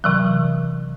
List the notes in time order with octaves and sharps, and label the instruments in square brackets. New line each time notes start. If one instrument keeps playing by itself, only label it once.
[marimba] C3 E3 F#3